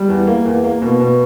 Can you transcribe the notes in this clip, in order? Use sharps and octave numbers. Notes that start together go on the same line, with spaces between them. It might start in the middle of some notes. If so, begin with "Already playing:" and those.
Already playing: G3
E2
A#3
E2
A#3
B2
B2